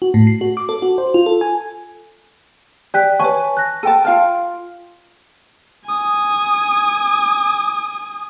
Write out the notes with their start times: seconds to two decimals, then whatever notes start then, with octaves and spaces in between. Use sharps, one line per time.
0.02 F#4
0.14 A2
0.27 C7
0.41 F#4
0.57 D6
0.69 A4
0.82 F#4
0.98 C5
1.14 F4
1.26 A4
1.41 G#5
2.94 G4 D5 F#6 B6
3.20 B4 C#5 G#5 A5 C#6
3.57 F#6 A#6
3.83 A4 G5 A5 D#7
4.05 F4 F5 G5 F6
5.86 G#5 D#6